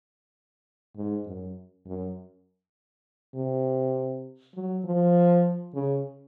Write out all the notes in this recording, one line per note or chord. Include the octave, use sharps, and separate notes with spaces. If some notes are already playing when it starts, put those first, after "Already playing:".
G#2
F#2
F#2
C3
F#3
F3
C#3